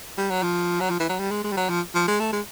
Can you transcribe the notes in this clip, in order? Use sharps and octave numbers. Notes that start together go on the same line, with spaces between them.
G3
F#3
F3
F#3
F3
E3
F#3
G3
G#3
G#3
G3
F#3
F3
F3
G#3
A3
G#3